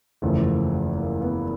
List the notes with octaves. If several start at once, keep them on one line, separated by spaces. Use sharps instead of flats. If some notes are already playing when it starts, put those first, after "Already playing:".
F#1 E2 C#3 F3 A3
A#3
B3